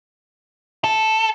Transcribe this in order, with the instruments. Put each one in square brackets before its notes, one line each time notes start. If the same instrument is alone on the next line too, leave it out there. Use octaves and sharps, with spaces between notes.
[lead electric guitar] A4